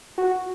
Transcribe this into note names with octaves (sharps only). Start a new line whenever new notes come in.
F#4